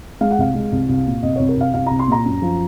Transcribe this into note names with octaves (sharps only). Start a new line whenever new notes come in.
G#3 F5
F#5
C2 F5
G#3
C2
C2
A#2
C2 D#5
C2 C#5
A#4
C2 F5
C2 F5
C2 A#5
C6
A#2 A#5
F#2
F3